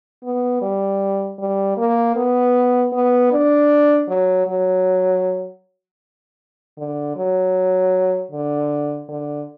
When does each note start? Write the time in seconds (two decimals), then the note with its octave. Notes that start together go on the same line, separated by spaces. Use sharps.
0.23 B3
0.62 G3
1.39 G3
1.77 A#3
2.16 B3
2.92 B3
3.32 D4
4.08 F#3
4.47 F#3
6.78 D3
7.16 F#3
8.32 D3
9.09 D3